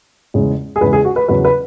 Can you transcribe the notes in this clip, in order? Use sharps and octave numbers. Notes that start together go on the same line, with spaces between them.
E2 C#3 G#3
G#4
E2 C#3 G#3 B4
G#4
F#4
B4
E2 C#3 F#3 B4
B4